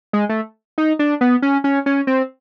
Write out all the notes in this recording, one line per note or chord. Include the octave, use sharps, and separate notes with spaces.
G#3
A3
D#4
D4
B3
C#4
C#4
C#4
C4